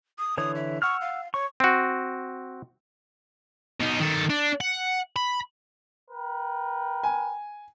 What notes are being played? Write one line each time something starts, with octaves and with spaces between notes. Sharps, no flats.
D#6
D3 E3 C#5 D#6
E5
F#5 C#6 E6 F6
F5
C#5 C#6
C4 F#4
B2 D#4
D#3 A4
D4
F#5
B5
A#4 B4 G5
G#5